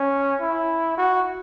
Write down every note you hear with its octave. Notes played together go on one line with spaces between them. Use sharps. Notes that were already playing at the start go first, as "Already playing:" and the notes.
Already playing: C#4
E4
F#4